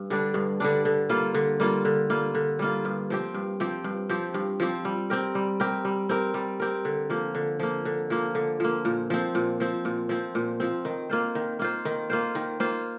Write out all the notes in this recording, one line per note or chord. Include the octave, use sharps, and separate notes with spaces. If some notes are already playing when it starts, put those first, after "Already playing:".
Already playing: G2
D3 G3 D4
G2
D3 G3 D4
D3
G3 A#3 F4
D3
G3 A#3 F4
D3
G3 A#3 F4
D3
G3 A#3 F4
G2
F3 C4 G4
G2
F3 C4 G4
G2
F3 C4 G4
G2
F3 C4 G4
G3
C4 G4 A#4
G3
C4 G4 A#4
G3
C4 G4 A#4
G3
C4 G4 A#4
D3
F3 A#3
D3
F3 A#3
D3
F3 A#3
D3
F3 A#3
A#2
F3 C4
A#2
F3 C4
A#2
F3 C4
A#2
F3 C4
D#3
A#3 F4 C5
D#3
A#3 F4 C5
D#3
A#3 F4 C5
D#3
A#3 F4 C5